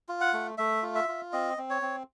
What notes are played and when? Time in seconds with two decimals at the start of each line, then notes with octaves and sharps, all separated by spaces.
0.09 F4
0.21 F#5
0.33 A3
0.58 A3 E5
0.83 F4
0.95 E5
1.08 F4
1.33 C4 D#5
1.58 C4
1.70 C#5
1.82 C4